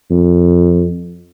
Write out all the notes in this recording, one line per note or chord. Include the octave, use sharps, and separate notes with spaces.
F2